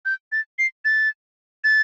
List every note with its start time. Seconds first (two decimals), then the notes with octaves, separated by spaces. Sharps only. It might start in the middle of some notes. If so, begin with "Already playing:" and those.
0.05 G6
0.32 A6
0.59 C7
0.85 A6
1.64 A6